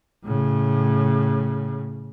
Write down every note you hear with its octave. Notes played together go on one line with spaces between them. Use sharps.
A2 C#3